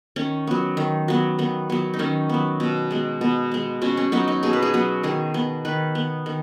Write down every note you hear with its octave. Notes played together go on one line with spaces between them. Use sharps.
D#3 C#4
F#3 B3
D#3
F#3 B3
D#3 B3
F#3 B3
D#4
D#3 C#4
F#3 B3
B2
G#3 B3
B2 B3
G#3 B3
B2 C#4
C#4
F#3 B3 D#4
D#4
B2 G#4
B4
G#4
F#3 B3
D#3 G#4
B3
D#3 B4
B3
D#3